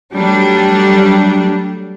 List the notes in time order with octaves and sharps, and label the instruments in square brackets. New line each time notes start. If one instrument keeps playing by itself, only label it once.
[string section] F#3 G3 A3 D4